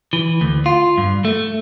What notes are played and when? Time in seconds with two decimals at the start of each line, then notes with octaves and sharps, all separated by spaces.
0.13 E3
0.41 D2
0.66 F4
0.98 G2
1.25 A3